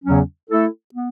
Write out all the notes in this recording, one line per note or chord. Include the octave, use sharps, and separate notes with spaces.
E2 C#3 F#3 C#4
A3 E4 A4
B3